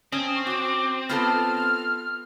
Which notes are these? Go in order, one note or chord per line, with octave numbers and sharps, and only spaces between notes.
C4 C#4 D#6
C#6
F#4 D6
B3 F4 A4 F6